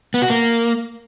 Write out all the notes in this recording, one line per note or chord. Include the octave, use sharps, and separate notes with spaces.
B3
F#4
A#3